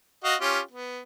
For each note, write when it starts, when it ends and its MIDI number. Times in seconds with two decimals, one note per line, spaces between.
0.24 0.35 66
0.24 0.35 75
0.24 0.35 77
0.41 0.60 61
0.41 0.60 65
0.41 0.60 67
0.71 1.00 59